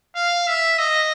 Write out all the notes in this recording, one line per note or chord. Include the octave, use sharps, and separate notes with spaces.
F5
E5
D#5